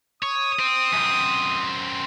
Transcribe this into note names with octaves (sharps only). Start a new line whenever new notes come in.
C#5 D#6
C4
F#2 C4